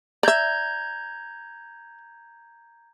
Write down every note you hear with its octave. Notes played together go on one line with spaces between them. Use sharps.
D5 E5 A#5 G6 G#6